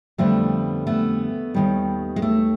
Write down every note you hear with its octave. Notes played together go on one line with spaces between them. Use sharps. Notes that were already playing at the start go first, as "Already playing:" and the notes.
F2 D3 G3 A3 B3
A3 B3
D#2 D#3 G3
G#3
A3